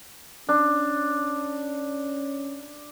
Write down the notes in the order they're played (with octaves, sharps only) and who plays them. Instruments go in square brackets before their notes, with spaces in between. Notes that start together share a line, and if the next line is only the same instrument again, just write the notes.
[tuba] C#4 [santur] D4